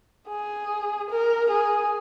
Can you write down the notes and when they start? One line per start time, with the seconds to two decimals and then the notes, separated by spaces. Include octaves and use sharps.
0.28 G#4
1.09 A#4
1.50 G#4